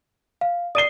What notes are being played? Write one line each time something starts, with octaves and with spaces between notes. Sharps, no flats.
F5
D5 D#6 C7 D#7 G7